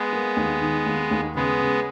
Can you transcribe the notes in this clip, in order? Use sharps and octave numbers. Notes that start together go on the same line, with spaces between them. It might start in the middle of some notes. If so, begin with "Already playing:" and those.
Already playing: G#3 B3
A#3
D#2
D#3
D#2
D#2
C#3 G#3 B3
C#3